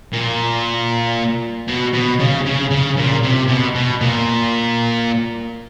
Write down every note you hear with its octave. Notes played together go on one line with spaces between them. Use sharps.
A#2
B2
B2
C#3
C#3
C#3
A#2
C3
B2
B2
A#2